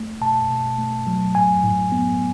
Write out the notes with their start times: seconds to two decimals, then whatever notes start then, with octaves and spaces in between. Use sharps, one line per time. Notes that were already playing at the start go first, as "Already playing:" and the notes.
Already playing: A3
0.21 B2 A5
0.50 B2
0.79 A3
1.07 F#3
1.35 A2 G#5
1.63 A2
1.92 B3